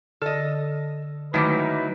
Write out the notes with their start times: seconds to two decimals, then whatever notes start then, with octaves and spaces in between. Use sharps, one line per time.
0.22 D3 A4 D#5
1.34 G#2 D#3 F#3 A3 D#4 E4 B4 D6